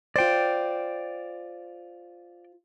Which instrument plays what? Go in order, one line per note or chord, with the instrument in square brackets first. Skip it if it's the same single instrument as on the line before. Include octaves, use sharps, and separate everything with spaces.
[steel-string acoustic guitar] F4 C5 [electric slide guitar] D5 G5